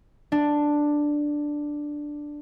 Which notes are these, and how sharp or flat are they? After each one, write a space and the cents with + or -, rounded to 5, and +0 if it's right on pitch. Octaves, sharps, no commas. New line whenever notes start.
D4 +5